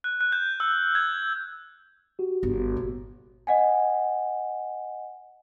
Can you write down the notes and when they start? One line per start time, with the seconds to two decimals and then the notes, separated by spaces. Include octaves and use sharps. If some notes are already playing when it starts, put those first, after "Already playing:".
0.04 F#6
0.21 F#6
0.32 G6
0.60 E6
0.95 G#6
2.19 F#4 G4
2.43 G1
2.77 A#2
3.47 D#5 F#5 G#5